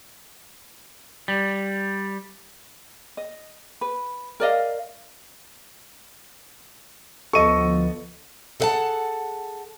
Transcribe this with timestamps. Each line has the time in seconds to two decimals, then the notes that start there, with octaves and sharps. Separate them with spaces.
1.28 G3
3.17 D#5
3.81 B4
4.40 A#4 D5 D#5 F5
7.33 D2 F3 B3 A4 D#5 C#6 D#7
8.60 G#4 A4 B4 F5 F#5 A5